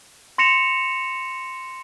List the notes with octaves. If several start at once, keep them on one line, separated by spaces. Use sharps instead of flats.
C6 A#6 C#7 E7 F7